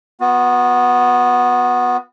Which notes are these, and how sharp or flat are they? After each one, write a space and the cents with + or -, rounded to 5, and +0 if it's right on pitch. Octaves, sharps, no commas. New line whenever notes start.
B3 +0 F#4 -40